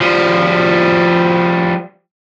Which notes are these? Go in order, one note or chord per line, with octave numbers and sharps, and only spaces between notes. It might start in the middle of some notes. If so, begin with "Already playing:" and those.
F3 G3